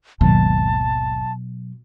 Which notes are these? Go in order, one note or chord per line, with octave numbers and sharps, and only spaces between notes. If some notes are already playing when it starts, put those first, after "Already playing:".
G#1 D#2 B2 F#3 A5